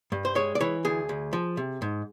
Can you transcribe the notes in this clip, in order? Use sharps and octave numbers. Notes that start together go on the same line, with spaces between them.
G2
C5
G#3 C#5
D5
E3 C#5
D2 G#4
D2
F3
C3
G#2